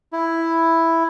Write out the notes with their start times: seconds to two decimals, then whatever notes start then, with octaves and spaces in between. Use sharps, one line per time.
0.13 E4